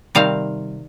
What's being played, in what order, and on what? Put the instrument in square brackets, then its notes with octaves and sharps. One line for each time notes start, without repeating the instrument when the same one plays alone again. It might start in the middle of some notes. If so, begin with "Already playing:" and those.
[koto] C3 D#3 G3 C4 F5